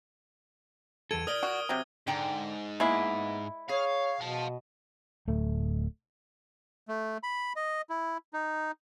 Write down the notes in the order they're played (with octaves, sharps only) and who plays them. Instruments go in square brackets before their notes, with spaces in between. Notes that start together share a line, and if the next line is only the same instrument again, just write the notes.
[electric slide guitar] E2 A4 [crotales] G#6 D7 D#7
[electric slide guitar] A#4 D5 [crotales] D#6 F6 G7
[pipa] F#4
C3 F#3
[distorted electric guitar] G#2 [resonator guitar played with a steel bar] D3 G5 A#5
[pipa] G#3 E4 [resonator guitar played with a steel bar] A#3 B3 G#4
[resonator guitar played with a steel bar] G#4 [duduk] C#5 [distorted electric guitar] F5
[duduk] B2 [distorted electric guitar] F5 A5
[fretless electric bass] D1 A3
[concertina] A3
B5
D#5
E4
D#4